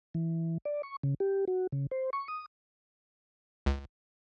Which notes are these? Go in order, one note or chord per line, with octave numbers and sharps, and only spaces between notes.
E3
D5
C#6
C#3
G4
F#4
C#3
C5
C#6
D#6
C#2